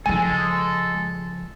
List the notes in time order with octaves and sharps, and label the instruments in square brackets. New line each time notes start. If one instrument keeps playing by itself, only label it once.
[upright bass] C#3 F3 [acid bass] G#3 [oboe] A4 [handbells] G#5